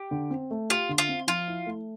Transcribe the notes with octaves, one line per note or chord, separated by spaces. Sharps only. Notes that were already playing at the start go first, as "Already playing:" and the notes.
Already playing: G4
D3
C4
A3
F4 G4
D3
F4
C4
F3 F4
E4
A3